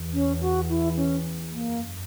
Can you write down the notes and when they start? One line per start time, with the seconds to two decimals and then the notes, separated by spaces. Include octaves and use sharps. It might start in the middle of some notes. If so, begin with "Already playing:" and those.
Already playing: E2
0.13 C#4
0.41 F#4
0.69 E4
0.97 C#4
1.51 F#2 A#3